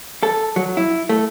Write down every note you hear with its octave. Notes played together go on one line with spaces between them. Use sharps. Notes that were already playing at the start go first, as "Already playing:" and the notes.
A4
F#3
E4
A3